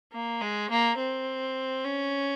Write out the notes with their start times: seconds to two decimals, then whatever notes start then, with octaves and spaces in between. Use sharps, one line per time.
0.12 A#3
0.41 G#3
0.70 A#3
0.98 C4
1.84 C#4